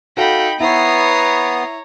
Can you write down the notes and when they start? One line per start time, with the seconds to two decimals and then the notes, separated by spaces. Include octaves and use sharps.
0.17 D#4 F#4 A4 F5 G5 B5
0.60 B3 E4 C#5 A#5 D#6 C7